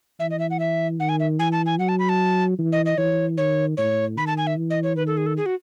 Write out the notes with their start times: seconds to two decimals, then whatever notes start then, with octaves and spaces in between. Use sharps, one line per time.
0.20 E3 E5
0.31 D#5
0.39 E5
0.51 F#5
0.60 E5
1.00 D#3 F#5
1.09 G#5
1.20 E5
1.39 E3 G#5
1.52 A5
1.66 G#5
1.79 F#3 F#5
1.89 A5
1.99 B5
2.09 A5
2.59 E3
2.72 D#5
2.86 D#5
2.98 E3 C#5
3.37 D#3 C#5
3.77 A2 C#5
4.17 D#3 B5
4.27 A5
4.37 G#5
4.47 E5
4.57 E3
4.70 D#5
4.83 C#5
4.96 D#3 B4
5.07 A4
5.17 G#4
5.26 A4
5.37 G#4
5.46 F#4